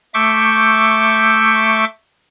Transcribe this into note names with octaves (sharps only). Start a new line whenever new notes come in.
A3 E5 C#6 D6 G6